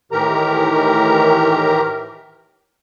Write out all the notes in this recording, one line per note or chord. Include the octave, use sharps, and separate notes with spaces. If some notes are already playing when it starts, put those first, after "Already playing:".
A2 D#3 E3 G4 A#4 A#5